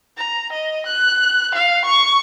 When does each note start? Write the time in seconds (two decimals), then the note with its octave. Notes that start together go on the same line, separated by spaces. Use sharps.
0.18 A#5
0.53 D#5
0.86 F#6
1.55 F5
1.85 C#6